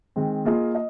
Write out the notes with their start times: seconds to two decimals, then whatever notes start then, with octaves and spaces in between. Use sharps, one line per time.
0.16 D#3 G#3 C4
0.45 A#3 F4 G#4 D#5
0.75 D#5